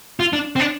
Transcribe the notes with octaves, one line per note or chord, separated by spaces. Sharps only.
F4
D4
C4
D4